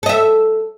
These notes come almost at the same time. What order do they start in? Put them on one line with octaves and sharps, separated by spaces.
A4 D#5 E5